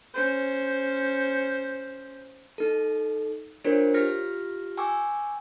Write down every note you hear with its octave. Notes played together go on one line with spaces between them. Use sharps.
C#4 C5
D#4 A4
D4 F4 A#4 C5 C#5
F4 G4 F6 A#6
G5 G#5 C#6 D6 E6